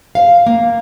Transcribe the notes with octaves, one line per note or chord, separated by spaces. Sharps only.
F5
A#3